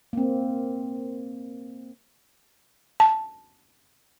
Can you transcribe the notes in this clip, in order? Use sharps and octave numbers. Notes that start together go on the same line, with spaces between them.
A#3 C4
A5